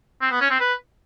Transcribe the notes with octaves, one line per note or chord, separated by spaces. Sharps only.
C4
B3
C#4
C4
B4